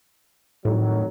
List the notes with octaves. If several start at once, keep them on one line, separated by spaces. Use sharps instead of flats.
F2 A2 D#3 F#3